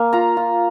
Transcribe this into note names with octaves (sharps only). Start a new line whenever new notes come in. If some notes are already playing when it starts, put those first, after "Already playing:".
Already playing: A#3 F5 G#5
F4 A#5
F4